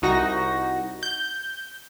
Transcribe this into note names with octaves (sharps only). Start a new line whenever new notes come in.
C2 D#4 F#4 A#6
G6